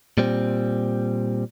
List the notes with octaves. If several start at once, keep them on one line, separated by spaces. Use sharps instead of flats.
A#2 G3 C4